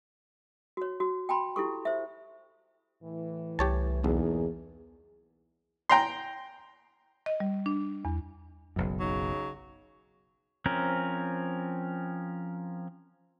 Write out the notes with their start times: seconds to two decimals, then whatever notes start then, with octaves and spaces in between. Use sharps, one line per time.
0.77 F#4 C#5
1.00 F#4
1.29 G5 A5 B5 C6
1.56 E4 G4 A4 C#6
1.85 C5 E5
3.03 A2 E3
3.59 C2 G4 C#5 A5
4.04 B1 E2 A#3 D#4 G#4
5.89 G5 A#5 C6
7.26 D#5
7.40 G3
7.66 D4
8.05 E2
8.76 F#1 B1 F#2
9.00 C#3 F#3 D#4
10.66 F3 C4 C#4 A#4